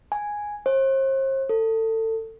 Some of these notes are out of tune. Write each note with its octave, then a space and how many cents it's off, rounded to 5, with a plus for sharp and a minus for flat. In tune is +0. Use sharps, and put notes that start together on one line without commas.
G#5 +0
C5 +40
A4 +25